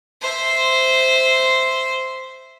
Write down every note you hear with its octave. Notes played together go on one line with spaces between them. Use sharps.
C5 E5